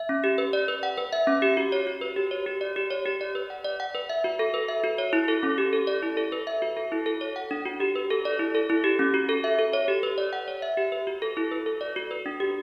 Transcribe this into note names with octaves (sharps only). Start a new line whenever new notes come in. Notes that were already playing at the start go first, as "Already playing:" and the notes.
Already playing: E5
C#4
G4
B4
D5
B4
F#5
B4
E5
C#4
G4
F#4
C#5
F#4
B4
G4
C#5
G4
D5
G4
C#5
G4
D5
B4
F#5
D5
F#5
B4
E5
F#4
A4
B4
E5
F#4
C#5
E4
A4
C#4
G4
A4
D5
E4
A4
B4
E5
F#4
A4
E4
A4
C#5
F#5
D4
F#4
G4
B4
A4
D5
E4
A4
E4
G4
C#4
F#4
A4
E5
A4
C#5
G4
B4
D5
F#5
C#5
E5
G4
B4
F#4
A4
E4
B4
A4
D5
F#4
B4
D4
G4